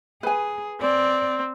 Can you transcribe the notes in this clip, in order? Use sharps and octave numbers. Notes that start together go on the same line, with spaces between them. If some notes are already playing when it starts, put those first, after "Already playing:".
G#4 B4 G#5
C4 D5